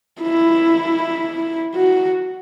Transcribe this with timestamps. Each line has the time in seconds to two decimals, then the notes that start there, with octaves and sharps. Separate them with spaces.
0.22 E4
1.75 F#4